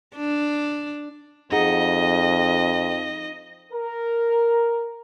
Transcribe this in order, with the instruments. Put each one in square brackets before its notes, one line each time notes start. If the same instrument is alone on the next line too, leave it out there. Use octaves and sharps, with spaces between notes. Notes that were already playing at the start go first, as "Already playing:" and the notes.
[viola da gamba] D4
[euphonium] F2 [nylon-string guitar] D#4 G#4 F#5 [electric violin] D#5
[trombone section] A#4